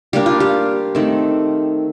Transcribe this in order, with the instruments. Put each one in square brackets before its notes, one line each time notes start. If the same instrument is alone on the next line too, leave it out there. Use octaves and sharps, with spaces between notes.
[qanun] G3 A#3 D4 G4
F4
G4
D#3 A3 C4